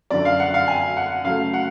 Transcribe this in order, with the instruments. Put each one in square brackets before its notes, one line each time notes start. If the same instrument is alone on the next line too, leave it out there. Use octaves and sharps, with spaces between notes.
[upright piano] F#2 D3 F#3 D5
F5
F#5
F5
G#5
F#5
C#3 F#3 A3 F5
F#5